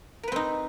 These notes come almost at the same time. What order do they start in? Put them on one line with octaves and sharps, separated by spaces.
A#4 B4 C4 D#4